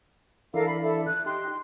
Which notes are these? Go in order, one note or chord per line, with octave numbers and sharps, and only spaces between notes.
E3 D4 E4 A4 A#4 F5
B5
A4 E5
F#6
D#4 G4 C6